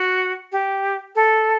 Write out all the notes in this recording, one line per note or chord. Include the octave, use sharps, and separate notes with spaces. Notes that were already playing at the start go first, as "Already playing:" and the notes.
Already playing: F#4
G4
A4